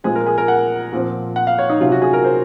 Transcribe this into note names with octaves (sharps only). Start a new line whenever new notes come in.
A#2 F3 G#3 C4 G#4
A#4
G#4
A#4
F#5
A#2 F3 C4
F#5
F5
C#5
D#4
C3 F#3 C#4 F4
F#4
G#4
A#4
C5